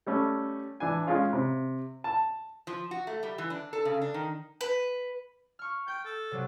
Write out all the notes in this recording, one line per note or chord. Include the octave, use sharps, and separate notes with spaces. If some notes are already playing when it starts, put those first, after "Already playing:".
G3 A3 C#4
E3 D4 G#5
G#3 C#4 F4
C3
A5
F3
F#4
A3
G3
E3
D4
A4
C#3
D4
D#3
B4
C#6 F6
G5 G6
A4
C3 F#3 G3